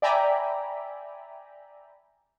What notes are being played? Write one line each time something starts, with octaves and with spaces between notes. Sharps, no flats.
D5 E5 G5 G#5 A#5 B5